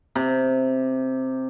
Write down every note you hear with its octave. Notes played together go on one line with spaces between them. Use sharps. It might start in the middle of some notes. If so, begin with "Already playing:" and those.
C3